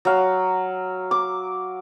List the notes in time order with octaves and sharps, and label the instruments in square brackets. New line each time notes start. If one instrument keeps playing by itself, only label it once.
[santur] F#3 F5
D6